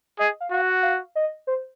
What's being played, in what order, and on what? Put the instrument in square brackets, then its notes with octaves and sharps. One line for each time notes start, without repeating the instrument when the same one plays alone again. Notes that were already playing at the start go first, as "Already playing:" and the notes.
[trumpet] G#4 [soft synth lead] D#5
[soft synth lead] F5
[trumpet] F#4 [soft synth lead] F5
[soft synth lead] F#5
F5
D#5
C5